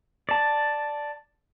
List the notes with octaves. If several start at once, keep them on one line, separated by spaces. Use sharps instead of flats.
D5 A5